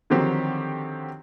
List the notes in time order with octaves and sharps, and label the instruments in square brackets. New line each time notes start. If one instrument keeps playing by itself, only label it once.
[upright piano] D3 D#3 F3 F#3 C4 G4